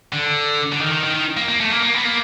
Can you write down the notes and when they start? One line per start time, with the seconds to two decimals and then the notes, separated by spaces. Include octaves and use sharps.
0.13 D3
0.72 D3
0.80 D#3
0.92 D#3
1.03 D#3
1.15 D#3
1.37 A#3
1.48 A#3
1.60 A3
1.71 A#3
1.83 A#3
1.94 B3
2.05 A#3